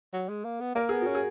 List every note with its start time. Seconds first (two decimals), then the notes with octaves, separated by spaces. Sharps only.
0.13 F#3
0.29 G#3
0.44 A#3
0.60 B3
0.75 A#3 A#4
0.89 B3 G#4
1.02 C#4 F#4
1.15 G#4